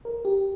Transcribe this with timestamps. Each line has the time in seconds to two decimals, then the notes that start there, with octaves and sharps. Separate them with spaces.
0.05 A#4
0.25 G4